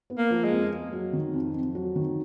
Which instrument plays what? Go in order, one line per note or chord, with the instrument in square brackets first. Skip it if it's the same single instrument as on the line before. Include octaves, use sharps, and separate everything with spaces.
[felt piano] B3
[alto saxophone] A#3
[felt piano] F3
[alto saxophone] G#3
[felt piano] F2
F2
F#3
D#3
F2
F2
F#3
D#3